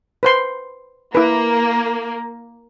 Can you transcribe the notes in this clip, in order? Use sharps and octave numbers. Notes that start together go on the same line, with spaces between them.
B4 C5 C6
A#3 E4 B4